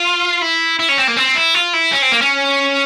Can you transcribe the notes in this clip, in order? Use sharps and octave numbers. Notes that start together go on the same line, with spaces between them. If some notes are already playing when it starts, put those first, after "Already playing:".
Already playing: F4
E4
E4
C#4
C4
A#3
C4
E4
F4
E4
C#4
C4
A#3
C#4